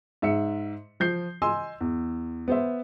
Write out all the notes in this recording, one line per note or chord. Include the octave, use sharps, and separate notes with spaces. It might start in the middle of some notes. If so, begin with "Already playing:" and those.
G#2 E5 C#7
F3 G6 C7
D#5 G#5 C6 E6
E2
B3 C5 E5